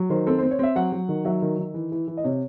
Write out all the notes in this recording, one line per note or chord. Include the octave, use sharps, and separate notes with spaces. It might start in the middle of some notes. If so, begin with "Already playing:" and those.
Already playing: F#3
D#3 C5
C4 A4
C4 C5
C#5
C4 E5
F#3 F#5
F#3
D#3
F#3 E5
D#3
D#3
E3
E3
E3
D#5
C3 C#5